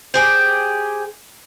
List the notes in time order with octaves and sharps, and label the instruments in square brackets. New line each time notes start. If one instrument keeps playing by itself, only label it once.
[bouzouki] G4 G#4 C5